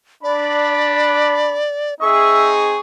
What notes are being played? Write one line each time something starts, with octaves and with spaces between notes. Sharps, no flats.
D4 D5 B5
C4 D#4 G#4 E5 C#6